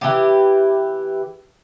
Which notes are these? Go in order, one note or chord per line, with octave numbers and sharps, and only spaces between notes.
E3 G4